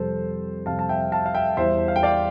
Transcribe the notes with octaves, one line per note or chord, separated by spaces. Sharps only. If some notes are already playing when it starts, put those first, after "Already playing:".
Already playing: F2 C3 G3 A4 C5
F2 C3 G3 F5 A5
A5
E5 G5
F5 A5
F5
E5 G5
E2 E3 G3 C5 E5
F5
G5
D5 F5